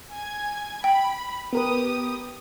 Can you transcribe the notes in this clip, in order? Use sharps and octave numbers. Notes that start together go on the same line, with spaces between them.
G#5 G#6
G5 B5
B3 G4 A#4 B4 D#6